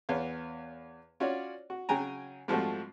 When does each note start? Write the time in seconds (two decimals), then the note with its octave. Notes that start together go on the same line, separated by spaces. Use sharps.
0.09 E2 B3 C#5 F5
1.20 C#4 F4 F#4 C#5 D5
1.70 F#4
1.89 C#3 F#3 G5 G#5 A#5
2.48 G#2 F3 G3 A3 C4 F#4